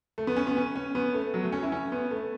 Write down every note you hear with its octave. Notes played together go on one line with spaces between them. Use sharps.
A3
B3
C#4
B3
C#4
C#4
B3
A3
F#3
A3
C#4
E4
C#4
B3
A3